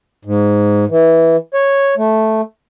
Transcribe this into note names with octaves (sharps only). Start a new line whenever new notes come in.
G#2
E3
C#5
A3